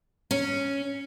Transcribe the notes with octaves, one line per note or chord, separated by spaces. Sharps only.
C#4